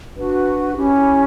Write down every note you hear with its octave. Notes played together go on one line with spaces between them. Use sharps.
D4 F#4 B4
C#4 E4 G4